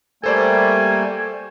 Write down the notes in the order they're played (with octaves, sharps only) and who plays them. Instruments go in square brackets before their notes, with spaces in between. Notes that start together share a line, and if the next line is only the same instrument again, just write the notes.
[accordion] G3 A3 A#3 [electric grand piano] A4 C5 D5 [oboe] G#5